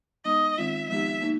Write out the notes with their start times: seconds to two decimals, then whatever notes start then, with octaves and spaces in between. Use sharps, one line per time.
0.25 G#3 B3 D#4 D#5
0.58 D#3 G#3 C4 F4 E5
0.89 F3 G#3 B3 D#4 G4 E5
1.21 A#3 D#4